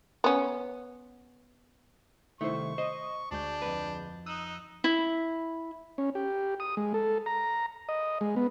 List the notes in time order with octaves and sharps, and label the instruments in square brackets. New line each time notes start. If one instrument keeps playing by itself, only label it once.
[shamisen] B3 C#4
[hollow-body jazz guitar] C2 A3 [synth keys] D#3 E4 C5 [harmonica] C#6
[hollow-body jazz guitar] C5 [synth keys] D#5
[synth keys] D2 G#3 G6 [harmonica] D4
[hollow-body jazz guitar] F2 B4
[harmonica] D#4 [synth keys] D#6 E6 F#6
[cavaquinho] E4
[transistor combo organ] C#4
G4
D#6
G#3
A4
A#5
D#5
G#3
B3